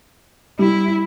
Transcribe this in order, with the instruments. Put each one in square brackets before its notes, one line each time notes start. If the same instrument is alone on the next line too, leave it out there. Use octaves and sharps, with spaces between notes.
[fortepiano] G3 [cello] E4